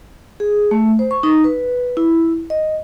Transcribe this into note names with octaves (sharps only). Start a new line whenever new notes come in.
G#4
A3
C5
C#6
D#4
B4
E4
D#5